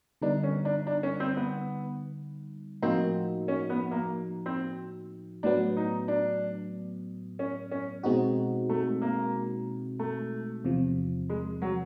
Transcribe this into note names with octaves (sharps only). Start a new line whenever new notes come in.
D3 G3 B3 D4 D#4
C#4
D4
D4
C#4
C4
B3
A2 F3 A#3 C4 D#4 F#4
C#4
B3
A#3
C4
A2 F#3 B3 D4
D#4
D4
C#4
C#4
B2 G#3 C4 D#4 F#4
A3
A#3
A3
E2 C3 F3
G#3
F#3